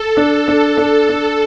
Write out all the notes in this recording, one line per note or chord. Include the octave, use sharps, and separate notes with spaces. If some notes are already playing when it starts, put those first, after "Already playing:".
Already playing: A4
D4
D4
D4 A4
D4